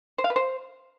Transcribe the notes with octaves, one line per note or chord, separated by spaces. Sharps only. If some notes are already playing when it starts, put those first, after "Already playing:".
C5
F5
B4
C5